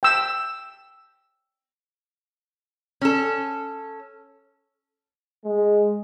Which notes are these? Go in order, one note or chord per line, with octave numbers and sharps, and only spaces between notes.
G5 E6
C#4 A4
G#3